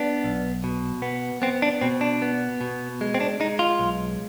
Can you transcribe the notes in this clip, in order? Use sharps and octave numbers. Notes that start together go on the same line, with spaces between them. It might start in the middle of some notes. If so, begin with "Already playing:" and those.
Already playing: B3 D4
B1
B2
B3
B3 C4
D4
B2 C4
D4
B3
B2
G#3
C4
D4
G#3 D#4
F4
B1